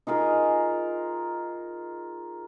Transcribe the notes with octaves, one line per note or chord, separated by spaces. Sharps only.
D#4 F4 G#4 A#4